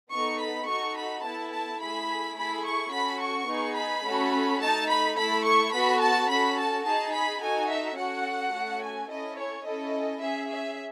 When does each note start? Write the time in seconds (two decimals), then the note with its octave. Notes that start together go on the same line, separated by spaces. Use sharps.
0.11 B3 D#4 A4 C#6
0.39 B5
0.66 D#4 F#4 A4 C#6
0.95 B5
1.23 B3 E4 A4 A5
1.51 A5
1.79 A3 E4 G#4 B5
2.35 A3 E4 G#4 B5
2.63 C#6
2.91 C#4 F#4 A4 B5
3.20 C#6
3.47 B3 D#4 G#4
3.76 B5
4.03 A3 C#4 F#4 A4
4.60 A3 D#4 A4 A5
4.88 B5
5.16 A3 E4 A4 B5
5.44 C#6
5.72 B3 F#4 A4 B5
6.00 A5
6.28 C#4 F#4 A4 B5
6.56 A5
6.84 D#4 G#4 A5
7.12 B5
7.40 D#4 F#4 A4 G#5
7.68 E5
7.96 C#4 F#4 A4 F#5
8.52 A3 C#4 F#4
8.81 G#5
9.08 C#4 E4 A4 D#5
9.36 C#5
9.64 C#4 E4 A4 D#5
10.21 C#4 G#4 E5
10.49 E5